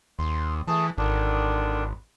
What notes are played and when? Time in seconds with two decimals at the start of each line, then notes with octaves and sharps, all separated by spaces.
0.19 D#2 C6
0.68 E3 A3 G#4 A5
0.98 G#1 D3 D#3 D4